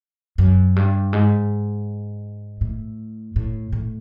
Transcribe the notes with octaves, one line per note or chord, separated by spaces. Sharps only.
F#2
G2
G#2
A2
A2
A2